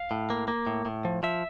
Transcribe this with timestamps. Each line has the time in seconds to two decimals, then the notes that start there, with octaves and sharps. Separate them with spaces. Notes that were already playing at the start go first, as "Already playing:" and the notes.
Already playing: F5
0.11 A2
0.30 A#3
0.48 A#3
0.67 A2
0.85 A2
1.05 F3
1.23 F3 E5